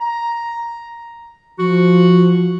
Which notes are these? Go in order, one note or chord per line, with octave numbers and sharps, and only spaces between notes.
A#5
F3 F#4